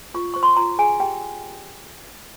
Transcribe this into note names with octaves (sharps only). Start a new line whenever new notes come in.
F4 C#6
C5 C#6
C6
F4 A#5
G#4 G#5
G4 G5